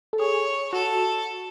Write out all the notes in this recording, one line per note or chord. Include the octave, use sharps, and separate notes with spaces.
A4
G#4 C#5
F#4 A4